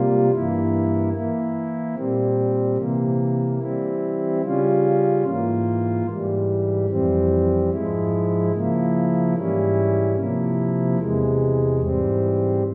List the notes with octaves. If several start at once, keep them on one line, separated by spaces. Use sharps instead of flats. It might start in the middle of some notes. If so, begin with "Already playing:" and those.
Already playing: C3 G3 A#3 F4
G2 E3 A#3 E4
E3 A#3 E4
A#2 G3 C4
C3 E3 A#3
E3 G3 C4 E4
C#3 G3 C#4 F4
G#2 E3 A#3 F4
G#2 E3 G3
F2 E3 G3 C4
G#2 F3 G#3 E4
C#3 F3 A#3 E4
G#2 E3 G3 C#4 E4
C3 F3 A#3 E4
E2 C3 E3 G#3
G#2 E3 G3 C4